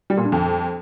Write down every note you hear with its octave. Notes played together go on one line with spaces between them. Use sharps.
G3
A#2
G2
F2